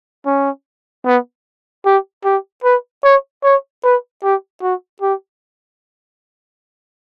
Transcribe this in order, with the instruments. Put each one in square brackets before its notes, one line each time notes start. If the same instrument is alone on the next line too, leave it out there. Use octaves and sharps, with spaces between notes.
[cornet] C#4
B3
G4
G4
B4
C#5
C#5
B4
G4
F#4
G4